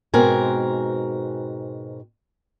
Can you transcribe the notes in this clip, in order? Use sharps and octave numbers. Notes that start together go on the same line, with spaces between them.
G#2 B2 C4 A#4 G#5